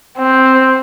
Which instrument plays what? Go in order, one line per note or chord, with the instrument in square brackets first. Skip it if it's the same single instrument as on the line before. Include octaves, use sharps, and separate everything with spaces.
[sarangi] C4